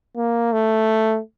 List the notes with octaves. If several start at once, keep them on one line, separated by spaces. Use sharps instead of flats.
A#3
A3